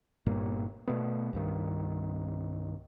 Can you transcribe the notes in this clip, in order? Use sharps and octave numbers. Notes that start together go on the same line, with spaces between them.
G1 G2 A#2 A#3
B2 A3 B3
C2 G2 D#3